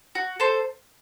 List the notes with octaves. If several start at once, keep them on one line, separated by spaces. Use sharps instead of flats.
F#4
A4 C5